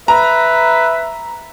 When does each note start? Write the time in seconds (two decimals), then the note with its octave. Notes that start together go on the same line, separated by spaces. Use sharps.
0.08 B4 E5 A#5